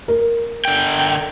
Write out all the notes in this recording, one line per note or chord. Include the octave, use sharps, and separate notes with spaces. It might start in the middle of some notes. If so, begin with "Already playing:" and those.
A#4
D3 G5